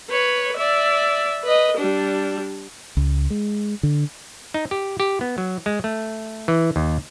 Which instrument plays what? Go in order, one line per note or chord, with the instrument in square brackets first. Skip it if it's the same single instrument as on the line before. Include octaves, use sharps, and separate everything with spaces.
[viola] B4 C#5
D5 E5
B4 D#5
G3 D4
[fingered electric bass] C#2
G#3
D3
[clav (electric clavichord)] D#4
G4
G4
B3
F#3
G#3
A3
E3
D#2